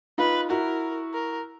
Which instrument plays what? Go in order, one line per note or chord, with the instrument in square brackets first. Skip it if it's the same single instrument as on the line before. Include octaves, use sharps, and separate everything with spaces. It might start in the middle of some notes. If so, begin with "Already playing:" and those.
[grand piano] D#4 F4 [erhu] B4
[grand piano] E4 F#4 [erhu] A#4
[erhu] A#4